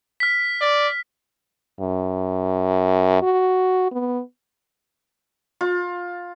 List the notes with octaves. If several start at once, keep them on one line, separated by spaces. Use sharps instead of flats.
F6 B6
D5
F#2
F#4
B3
F4